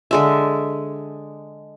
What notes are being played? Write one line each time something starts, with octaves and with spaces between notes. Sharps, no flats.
D3 G#3 E5